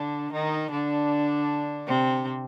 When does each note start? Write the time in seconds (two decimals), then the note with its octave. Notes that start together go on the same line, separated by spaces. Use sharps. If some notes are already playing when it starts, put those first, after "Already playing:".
Already playing: D3 D4
0.33 D#3 D#4
0.71 D3 D4
1.87 C3 C4